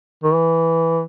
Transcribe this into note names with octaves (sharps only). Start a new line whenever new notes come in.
D#3
E3